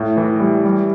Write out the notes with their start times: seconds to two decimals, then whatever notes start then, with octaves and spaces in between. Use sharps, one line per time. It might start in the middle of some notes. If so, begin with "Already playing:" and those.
Already playing: A2
0.17 E3
0.40 G3
0.65 G3